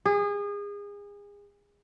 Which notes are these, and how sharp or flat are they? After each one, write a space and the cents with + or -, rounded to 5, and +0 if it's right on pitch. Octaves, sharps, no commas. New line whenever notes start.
G#4 -30